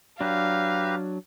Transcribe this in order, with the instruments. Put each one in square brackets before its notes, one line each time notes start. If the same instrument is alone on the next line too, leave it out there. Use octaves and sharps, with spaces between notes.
[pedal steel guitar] F#3 D4 [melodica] G4 B4 A#5 [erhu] F5